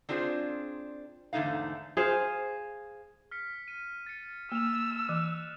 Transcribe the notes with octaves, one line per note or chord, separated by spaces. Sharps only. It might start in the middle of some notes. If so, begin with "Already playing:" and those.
C4 D4 F4 G#4 C5
E2 G#2 D3 A3 D#4 F5
G#4 C5 F5
F6 B6 C#7
D#7
A6 C#7
A#3 E6 F6 E7 F7
E3 F#6